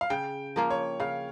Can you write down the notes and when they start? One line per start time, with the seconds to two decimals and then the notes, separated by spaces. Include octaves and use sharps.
0.01 F5
0.10 C#3 G5
0.56 F3 A#3 F4
0.70 C#5
1.00 C#3 F5